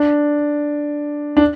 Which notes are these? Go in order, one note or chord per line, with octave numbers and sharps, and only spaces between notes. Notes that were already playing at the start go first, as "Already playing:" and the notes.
Already playing: D4
D4